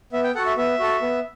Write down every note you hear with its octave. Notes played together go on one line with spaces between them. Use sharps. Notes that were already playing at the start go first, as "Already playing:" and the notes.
B3 E5
G5
F#4 A4 F#5
E5
B3 E5
F#4 A4
B3